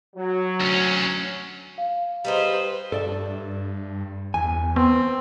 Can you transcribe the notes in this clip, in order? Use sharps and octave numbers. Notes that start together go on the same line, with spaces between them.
F#3
D2 C#4
F5
G3 D#4 G#4 B4 C5
G2 A4 D5 E5
E2 G#5
B3 C4